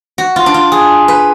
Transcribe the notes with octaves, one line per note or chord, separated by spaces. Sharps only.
F#4
F4
D4
F4
G#4
B4